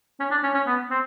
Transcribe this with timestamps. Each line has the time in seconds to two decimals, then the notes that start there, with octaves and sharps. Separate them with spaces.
0.20 C#4
0.31 D4
0.43 C#4
0.55 C#4
0.67 B3
0.91 C4